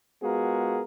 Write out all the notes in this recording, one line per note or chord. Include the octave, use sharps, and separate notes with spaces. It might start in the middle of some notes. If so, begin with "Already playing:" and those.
G#3 B3 F4 F#4 G#4 A#4